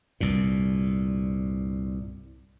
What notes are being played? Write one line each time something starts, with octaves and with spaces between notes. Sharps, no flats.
C2 G2 A#2